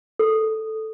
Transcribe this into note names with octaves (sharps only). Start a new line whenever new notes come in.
A4